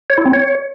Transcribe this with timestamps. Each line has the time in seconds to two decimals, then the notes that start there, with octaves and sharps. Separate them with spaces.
0.10 C#5
0.18 E4
0.26 C4
0.33 C#5